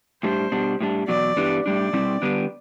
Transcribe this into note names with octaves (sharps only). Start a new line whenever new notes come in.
A2 G3 D4 C5
B2 G3 D4
A2 G3 D4
E2 B2 F#3 D5
G2 E3 G3 B3 D4
A2 G3 D4 D5
B2 G3 C4 E4
D3 G3 B3 D4